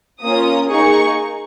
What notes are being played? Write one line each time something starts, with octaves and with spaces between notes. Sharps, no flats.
A#3 C#4 F4 D#6
A#3 D#4 G#4 C#6